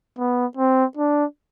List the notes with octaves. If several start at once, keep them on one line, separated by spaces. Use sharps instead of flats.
B3
C4
D4